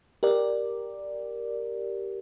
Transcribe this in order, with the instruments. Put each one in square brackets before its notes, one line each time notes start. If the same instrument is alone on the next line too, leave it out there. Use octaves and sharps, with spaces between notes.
[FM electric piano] G4 A#4 D5